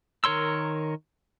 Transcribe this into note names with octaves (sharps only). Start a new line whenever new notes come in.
D#3 A#4 C#5 C6 E6